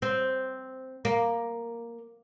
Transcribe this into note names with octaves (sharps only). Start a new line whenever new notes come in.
C4
A#3